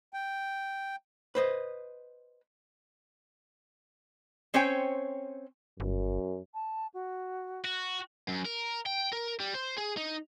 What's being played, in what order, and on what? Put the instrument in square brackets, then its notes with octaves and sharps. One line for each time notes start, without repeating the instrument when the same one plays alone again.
[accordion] G5
[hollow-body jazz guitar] B4 C5 D#5
[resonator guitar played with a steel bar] C4 C#4 C5 C#5 G5
[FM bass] G1 [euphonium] F#2
[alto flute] A5
F#4
[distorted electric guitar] F#4
[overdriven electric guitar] F#2
A#4
G5
A#4
G3
C5
G#4
D#4